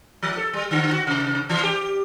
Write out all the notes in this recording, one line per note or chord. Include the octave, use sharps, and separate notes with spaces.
F3
A4
G3
D3
F#4
C3
E3
G4